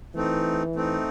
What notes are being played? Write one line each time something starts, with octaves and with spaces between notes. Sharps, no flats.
E3 A3 C4 D#4
A3 C4 D#4